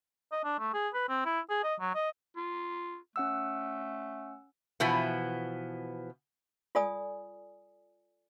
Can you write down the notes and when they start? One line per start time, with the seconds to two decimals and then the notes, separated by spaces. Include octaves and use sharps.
0.32 D#5
0.44 D4
0.59 A3
0.74 G#4
0.94 B4
1.09 C4
1.26 E4
1.50 G#4
1.64 D#5
1.80 F#3
1.95 D#5
2.36 F4
3.16 A3 C#4 F#5 E6
4.80 B2 E3 F3 B3
6.75 F4 A4 D5 G#5 D#6